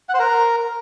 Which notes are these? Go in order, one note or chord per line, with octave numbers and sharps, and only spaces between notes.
F#5
C5
A#4